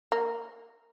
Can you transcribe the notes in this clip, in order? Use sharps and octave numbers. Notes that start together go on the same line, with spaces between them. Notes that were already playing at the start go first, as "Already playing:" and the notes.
A#3